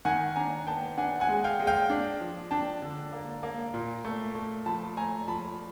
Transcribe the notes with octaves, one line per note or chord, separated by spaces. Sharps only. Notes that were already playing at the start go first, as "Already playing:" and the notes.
D#3 F#5 G#5
D4 G#5 A#5
B3 G5 A5
D4 F#5 G#5
F#5 G#5
G#3
F5 G5
G#3
F5 G5
D4
F3
D4 G5 A5
D3
A#3
A#3
A#2
A3
A3
F3 A5 B5
A3 G#5 A#5
F3 A5 B5